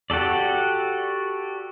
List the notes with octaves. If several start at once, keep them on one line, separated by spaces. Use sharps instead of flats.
F#4 G4 A4 D5